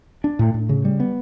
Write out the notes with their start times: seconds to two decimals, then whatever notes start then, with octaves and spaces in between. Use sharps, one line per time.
0.24 D4
0.39 A2
0.54 A2
0.69 C#3
0.85 G3
1.00 B3